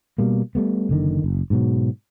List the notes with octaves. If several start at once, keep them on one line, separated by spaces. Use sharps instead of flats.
B2 G3 A#3
G3 A3 B3
F#1 D3 D#3
F#1
G#2 B2 F#3